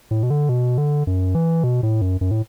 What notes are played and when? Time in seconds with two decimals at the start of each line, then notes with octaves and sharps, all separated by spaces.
0.11 A2
0.23 B2
0.30 D3
0.49 B2
0.78 D3
1.07 F#2
1.35 E3
1.64 B2
1.83 A2
2.02 F#2
2.21 F#2
2.31 A2